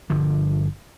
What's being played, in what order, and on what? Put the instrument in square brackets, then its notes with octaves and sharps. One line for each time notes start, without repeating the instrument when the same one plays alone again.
[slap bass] G1 D3 F3